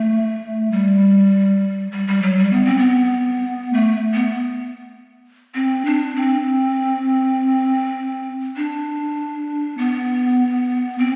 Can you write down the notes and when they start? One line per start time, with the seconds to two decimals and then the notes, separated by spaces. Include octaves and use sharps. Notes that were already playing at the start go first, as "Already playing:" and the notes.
Already playing: A3
0.71 G3
1.92 G3
2.08 G3
2.22 F#3
2.38 G3
2.53 B3
2.65 C4
2.78 B3
3.73 A3
4.14 B3
5.55 C4
5.85 D4
6.15 C4
8.56 D4
9.78 B3
10.98 C4